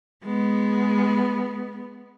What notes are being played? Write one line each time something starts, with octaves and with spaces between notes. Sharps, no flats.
G#3 B3